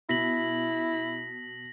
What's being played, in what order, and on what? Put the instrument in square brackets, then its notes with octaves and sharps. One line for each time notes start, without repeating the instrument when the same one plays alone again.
[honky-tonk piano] B2 [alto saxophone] E4 [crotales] A#6 B6 F#7